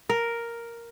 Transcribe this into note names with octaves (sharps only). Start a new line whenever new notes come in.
A#4